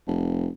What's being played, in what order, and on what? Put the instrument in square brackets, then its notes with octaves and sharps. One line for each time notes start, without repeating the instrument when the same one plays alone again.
[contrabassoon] F1